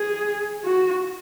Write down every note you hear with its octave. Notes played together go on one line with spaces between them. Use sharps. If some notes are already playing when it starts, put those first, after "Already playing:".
Already playing: G#4
F#4